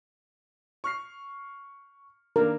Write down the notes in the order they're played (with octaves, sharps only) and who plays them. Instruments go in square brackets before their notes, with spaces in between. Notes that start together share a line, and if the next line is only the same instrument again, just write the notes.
[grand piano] C#6 F6 C7
[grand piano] D#3 A#3 D4 [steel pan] A#4